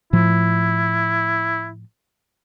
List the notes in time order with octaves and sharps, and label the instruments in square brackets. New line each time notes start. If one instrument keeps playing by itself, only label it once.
[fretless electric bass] A2 F3 [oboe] E4